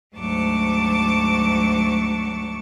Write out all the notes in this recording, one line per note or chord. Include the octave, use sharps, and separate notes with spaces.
D2 G#2 F#3 A5 C#6 D6